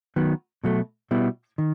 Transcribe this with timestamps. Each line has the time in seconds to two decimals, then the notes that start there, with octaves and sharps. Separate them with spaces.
0.16 D#3 F#3 B3
0.64 B2 F#3 A3
1.11 B2 G3 B3 E4
1.58 D#3